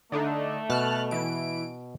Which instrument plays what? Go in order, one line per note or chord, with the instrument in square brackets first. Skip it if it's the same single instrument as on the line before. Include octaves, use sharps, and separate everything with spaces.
[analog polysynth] D3 D4 D#4 [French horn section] A3
[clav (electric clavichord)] B2 [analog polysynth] A5 F6 F#6
[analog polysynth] E3 D7